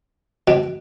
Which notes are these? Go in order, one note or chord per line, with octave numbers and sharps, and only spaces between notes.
B2